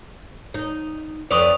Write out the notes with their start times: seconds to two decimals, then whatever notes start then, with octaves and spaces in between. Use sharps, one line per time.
0.54 D#4
1.31 F2 B4 D5 C#6 D#6 F7